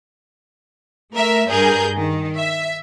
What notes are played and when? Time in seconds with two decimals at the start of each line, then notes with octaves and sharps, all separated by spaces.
1.13 A3 A#4 E5
1.50 G2 G#4 A#4 G6
1.96 D#3
2.38 E5